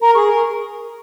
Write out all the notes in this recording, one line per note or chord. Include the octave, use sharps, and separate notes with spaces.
A#4 A#5
G#4 C#6
A#4